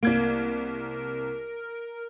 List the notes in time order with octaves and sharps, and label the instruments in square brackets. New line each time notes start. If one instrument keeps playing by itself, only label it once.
[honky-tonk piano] C2 G#6 D7 [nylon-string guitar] A#3 [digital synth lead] A#4